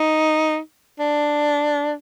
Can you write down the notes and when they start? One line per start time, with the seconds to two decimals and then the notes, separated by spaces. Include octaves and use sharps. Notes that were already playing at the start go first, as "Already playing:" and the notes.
Already playing: D#4
0.99 D4